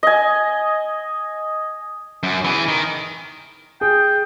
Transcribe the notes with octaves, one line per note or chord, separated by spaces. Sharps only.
D#5 G#5
F#2
E3 G#4
D#3
G#4 G5